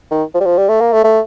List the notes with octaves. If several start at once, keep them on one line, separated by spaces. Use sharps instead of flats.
D#3
F3
G3
F3
G3
A3
A#3
A3
A3